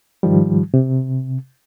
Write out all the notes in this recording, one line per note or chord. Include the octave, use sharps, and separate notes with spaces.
G#2 D#3 F3 G3
C3